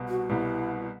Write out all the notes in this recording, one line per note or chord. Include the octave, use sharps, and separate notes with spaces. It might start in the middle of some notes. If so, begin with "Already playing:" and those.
Already playing: C2 B2 G3
F#4
C2 B2 G3 E4